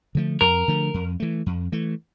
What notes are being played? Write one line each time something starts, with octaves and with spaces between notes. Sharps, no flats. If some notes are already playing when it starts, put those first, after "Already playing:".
D3 F3 A3
F2 A#4
D3 F3 A3
F2
E3 A3
F2
E3 A3